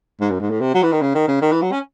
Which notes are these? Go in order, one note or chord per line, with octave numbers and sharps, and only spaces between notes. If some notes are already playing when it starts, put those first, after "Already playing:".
G#2
F#2
G#2
A2
C3
F#3
E3
D#3
C#3
D#3
C#3
D#3
E3
F#3
C#4